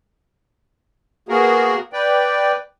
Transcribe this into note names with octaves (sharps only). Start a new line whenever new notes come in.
A#3 B3 F#4 G#4 A#4
B4 D5 G5